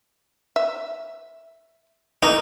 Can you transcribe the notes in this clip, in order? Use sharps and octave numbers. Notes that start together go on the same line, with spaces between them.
E5
E3 A3 A#3 D#4